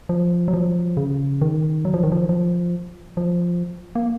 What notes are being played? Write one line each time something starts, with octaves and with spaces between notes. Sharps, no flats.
F3
F#3
F3
C#3
D#3
F#3
F3
D#3
F3
F3
F3
A#3